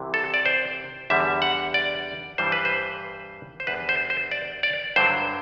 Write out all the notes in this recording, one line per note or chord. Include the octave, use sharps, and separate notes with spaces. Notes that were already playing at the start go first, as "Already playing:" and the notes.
Already playing: C2 C3 E3
A4
D5
C5
E2 D3 G3 E5
F#5
D5
G2 E3 G3 C5
B4
C5
C5
E2 D3 G3 B4
C5
C5
D5
D5
G2 D3 F#3 C5